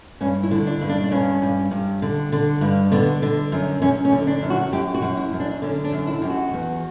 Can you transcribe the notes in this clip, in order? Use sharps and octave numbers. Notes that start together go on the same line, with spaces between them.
G2 C#4
E4
D3
D4
G2
D4
D4
G2 C#4
G2
G2
D3
D3
G2
D3 B3
D3
F#2
F#2 C#4
C#4
D3
D4
F#2
F#4
F#2 G4
F#4
F#2
E4
F#2
D4
D3 C#4
D4
F#2
E4
F#2 G4
F#4
E2